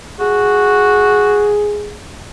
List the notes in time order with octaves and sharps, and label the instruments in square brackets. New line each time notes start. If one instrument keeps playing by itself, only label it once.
[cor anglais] F#4 [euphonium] G#4